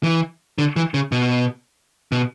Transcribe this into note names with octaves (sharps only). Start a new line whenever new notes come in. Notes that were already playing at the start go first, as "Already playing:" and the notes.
E3
D3
E3
C#3
B2
B2